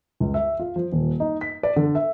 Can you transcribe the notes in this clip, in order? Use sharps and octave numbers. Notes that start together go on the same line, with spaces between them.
C#2
E5
F4
F3
D#1
D#4
B6
D5
D3
E5